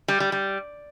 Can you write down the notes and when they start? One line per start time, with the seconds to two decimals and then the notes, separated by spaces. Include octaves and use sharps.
0.08 G3
0.20 G3
0.32 G3